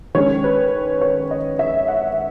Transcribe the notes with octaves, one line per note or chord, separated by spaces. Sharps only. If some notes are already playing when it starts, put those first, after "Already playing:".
D#3 G#3 C#4 C#5
B4
C#5
D#5
E5
F#5